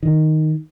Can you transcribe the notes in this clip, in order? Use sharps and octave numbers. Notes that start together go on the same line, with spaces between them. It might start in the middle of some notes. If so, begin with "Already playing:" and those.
D#3